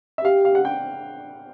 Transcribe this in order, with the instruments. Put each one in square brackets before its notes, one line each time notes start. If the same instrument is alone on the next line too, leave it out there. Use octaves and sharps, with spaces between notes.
[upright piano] E5
[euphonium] G4 [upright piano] F5
[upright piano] F5
F#5
G5